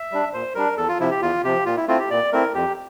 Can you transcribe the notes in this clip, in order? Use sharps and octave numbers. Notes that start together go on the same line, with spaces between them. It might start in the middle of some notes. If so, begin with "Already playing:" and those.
Already playing: E5
G3 D4
A#2 C5
G3 D4 A#4
E2 A4
F4
C3 F3 E4
G4
E2 F4
C3 F3 G4
A#2 F4
E4
A3 C4 E4 F4
G4
A#2 D5
A3 C4 E4 A#4
F2 G4